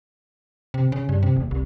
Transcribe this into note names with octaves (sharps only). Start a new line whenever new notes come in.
C3
C#3
G2
C3
D#1
C2